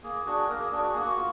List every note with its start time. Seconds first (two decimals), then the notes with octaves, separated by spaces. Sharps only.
0.04 A#3 G#4
0.26 D4 F#4 G#4
0.49 A#3 A#4
0.60 G#4
0.72 D4 F#4 G#4
0.83 F#4
0.92 G#4
0.95 A#3 F#4
1.17 F4